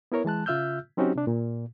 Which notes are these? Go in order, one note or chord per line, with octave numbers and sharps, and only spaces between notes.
B3 E4 A#4 C#5
E3 G#3 A5 F#6
C#3 F4 E5 E6 F6 G6
F#3 C4 C#4 D#4 F#4 G4
C3 D4
A#2